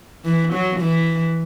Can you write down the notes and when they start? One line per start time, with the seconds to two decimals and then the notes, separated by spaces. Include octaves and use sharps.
0.25 E3
0.53 F#3
0.81 E3